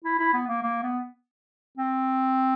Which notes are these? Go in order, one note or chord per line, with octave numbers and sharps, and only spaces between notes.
E4
E4
B3
A#3
A#3
B3
C4